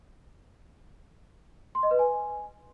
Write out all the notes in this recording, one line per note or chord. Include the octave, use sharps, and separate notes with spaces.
C6
D#5
B4
G#5